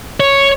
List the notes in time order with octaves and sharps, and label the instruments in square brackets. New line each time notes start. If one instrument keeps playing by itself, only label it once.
[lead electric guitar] C#5